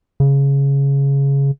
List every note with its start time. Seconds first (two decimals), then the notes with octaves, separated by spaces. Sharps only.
0.20 C#3